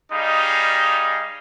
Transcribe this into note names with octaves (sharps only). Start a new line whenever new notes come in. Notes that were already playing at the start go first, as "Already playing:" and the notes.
G3 D#4 G#4 D#5 F5